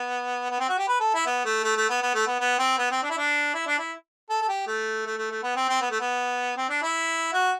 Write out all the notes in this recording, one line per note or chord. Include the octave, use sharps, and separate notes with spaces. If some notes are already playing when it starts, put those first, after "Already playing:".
Already playing: B3
B3
C4
F#4
G4
B4
A4
E4
B3
A3
A3
A3
B3
B3
A3
B3
B3
C4
B3
C4
D4
E4
D4
E4
D4
E4
A4
A4
G4
A3
A3
A3
A3
B3
C4
C4
B3
A3
B3
C4
D4
E4
F#4